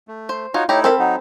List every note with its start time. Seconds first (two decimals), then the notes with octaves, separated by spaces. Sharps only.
0.08 A3
0.29 C5
0.54 D#4 F4 F#4 C#5
0.69 A3 D#4 E4 G4 C#5 A#5
0.84 C4 A4 A#4 B5
0.99 F#3 D#4 F#5